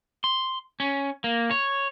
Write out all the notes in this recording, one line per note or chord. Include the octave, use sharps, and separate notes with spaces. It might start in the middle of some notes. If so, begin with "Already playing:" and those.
C6
C#4
A#3
C#5